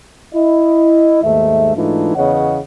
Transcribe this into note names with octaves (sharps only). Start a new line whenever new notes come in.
E4 D#5
D#2 G#2 A3 E5
G#2 E3 A3 D4 D#4 F4
E2 C#3 B3 C#5 D#5 F#5